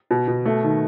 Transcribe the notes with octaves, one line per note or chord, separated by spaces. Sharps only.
B2
B2
A3
D#3